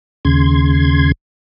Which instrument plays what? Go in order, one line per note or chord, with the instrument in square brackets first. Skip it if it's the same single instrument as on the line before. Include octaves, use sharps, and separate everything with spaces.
[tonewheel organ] D#2 C#3 C6 G#6